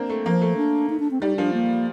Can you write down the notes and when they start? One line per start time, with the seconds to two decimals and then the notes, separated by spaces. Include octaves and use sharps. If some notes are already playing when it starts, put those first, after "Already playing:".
Already playing: A#3 C4 D4
0.09 A3
0.26 F3 A#3
0.41 A3
0.57 D4
0.90 D#4
1.00 D4
1.11 C4
1.21 G3 D#4
1.37 F3 D4
1.53 A#3